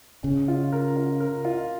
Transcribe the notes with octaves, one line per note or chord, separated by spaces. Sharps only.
C#3 C#4
F4
A#4
F4
A#4
F4